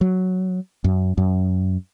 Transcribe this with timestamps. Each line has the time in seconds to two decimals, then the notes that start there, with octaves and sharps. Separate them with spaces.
0.01 F#3
0.84 F#2
1.18 F#2